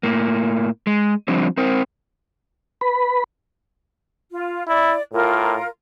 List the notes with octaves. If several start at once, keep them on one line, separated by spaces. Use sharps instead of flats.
A2 A#3
G#3
F3 G3 C4 D4
C4 A#4 C5
B4 B5
F4
E4 D5
A2 F4 A#4